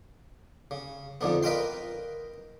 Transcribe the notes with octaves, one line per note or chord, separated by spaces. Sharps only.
C#3
F2 G#2 D3 B3
A#4 B4 D#5 F5 G5 C6